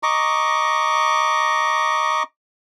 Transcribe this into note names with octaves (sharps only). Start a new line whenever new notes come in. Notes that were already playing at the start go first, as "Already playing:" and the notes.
D#5 A#5 C#6 D6